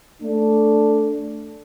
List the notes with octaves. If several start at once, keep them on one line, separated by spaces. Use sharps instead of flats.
A3 D4